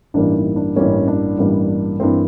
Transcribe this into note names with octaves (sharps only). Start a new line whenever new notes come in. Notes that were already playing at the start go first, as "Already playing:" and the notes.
A1 G2 E3 G3 A#3 D4
D#4
D4
A1 G2 E3 G3 A#3 C#4
D4
A1 G2 E3 G3 A#3
G2 E3 G3 A#3 C4